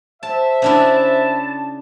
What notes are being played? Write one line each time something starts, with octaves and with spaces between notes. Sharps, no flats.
C5 E5 A5
C#3 D4 E4 A5